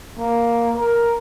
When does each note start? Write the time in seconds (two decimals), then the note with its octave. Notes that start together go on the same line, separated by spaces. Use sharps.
0.19 A#3
0.77 A#4